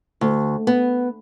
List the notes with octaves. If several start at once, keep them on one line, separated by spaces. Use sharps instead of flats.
D2
B3